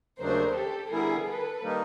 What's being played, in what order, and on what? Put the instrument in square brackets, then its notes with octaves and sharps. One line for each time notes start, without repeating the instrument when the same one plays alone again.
[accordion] D#2 C#3 F#3 A3 D4 [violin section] A#4 C5
[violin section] G4 A4
[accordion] D3 G3 B3 E4 [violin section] G#4 A#4
[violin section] A4 B4
[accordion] D#3 G3 A#3 D#4